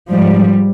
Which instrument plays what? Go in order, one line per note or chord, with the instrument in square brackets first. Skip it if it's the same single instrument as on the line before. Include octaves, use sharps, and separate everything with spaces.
[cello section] G#2 F3 G3